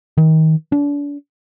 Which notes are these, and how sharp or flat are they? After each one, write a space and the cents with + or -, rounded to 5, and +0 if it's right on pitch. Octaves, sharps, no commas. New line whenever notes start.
D#3 +30
D4 -35